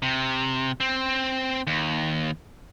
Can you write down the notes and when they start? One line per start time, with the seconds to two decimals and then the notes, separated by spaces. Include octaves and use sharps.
0.02 C3
0.80 C4
1.67 D#2